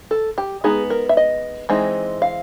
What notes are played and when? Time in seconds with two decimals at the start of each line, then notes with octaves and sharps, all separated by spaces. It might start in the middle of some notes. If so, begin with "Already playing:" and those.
0.11 A4
0.38 G4
0.64 G#3 B3 D#4 G#4
0.90 A#4
1.09 E5
1.17 D#5
1.69 E3 G#3 C4 D#4
2.22 F5